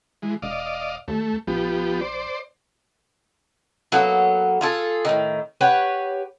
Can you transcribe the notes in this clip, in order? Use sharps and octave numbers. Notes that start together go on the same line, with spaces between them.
E3 G#3
E1 D5 D#5 F5
D#2 A3
A#1 F3 B3 G4
C5 D5
F#3 A#3 B3 A4
F4 G#4 A4
A2 D#3
G4 B4 C#5 F#5